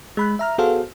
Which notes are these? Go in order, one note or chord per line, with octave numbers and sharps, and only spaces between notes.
G#3 B5 F#6
E5 A#5 F6
B3 F#4 G#4 A4 C5 F5